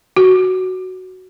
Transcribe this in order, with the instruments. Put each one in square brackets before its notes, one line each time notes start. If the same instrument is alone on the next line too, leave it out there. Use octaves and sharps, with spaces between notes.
[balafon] F#4